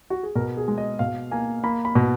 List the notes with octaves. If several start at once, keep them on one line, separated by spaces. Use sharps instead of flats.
F#4
G#4
B2 A#4
G#4
G#3
D#5
B2 F5
A#3 G#5
A#3 B5
B5
B2